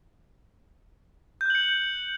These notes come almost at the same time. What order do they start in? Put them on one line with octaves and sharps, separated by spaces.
G6 F#6 F#7 C#7